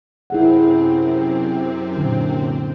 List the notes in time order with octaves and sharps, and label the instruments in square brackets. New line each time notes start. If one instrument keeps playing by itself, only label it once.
[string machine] F#2 C3 C4 [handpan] E4 G#4 F#5
[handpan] A#2 D3